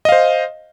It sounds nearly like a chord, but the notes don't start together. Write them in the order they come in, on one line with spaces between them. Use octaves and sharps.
D#5 F5 C5